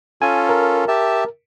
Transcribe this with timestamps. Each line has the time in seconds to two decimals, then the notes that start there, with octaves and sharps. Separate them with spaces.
0.22 C#4 F4 A4 G#5
0.49 A#4
0.88 G4 E5 A5